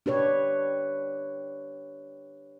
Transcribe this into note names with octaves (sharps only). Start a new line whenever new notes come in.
D4 G4 B4 C#5